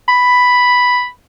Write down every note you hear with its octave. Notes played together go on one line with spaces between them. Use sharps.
B5